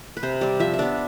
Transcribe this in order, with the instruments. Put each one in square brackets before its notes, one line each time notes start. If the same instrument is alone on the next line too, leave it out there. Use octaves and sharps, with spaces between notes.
[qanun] B4
C3 C5
G3 C4 D5
F3 E5
E5
B3 D4 D5